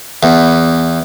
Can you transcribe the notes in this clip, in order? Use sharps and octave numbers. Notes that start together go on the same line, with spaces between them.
E2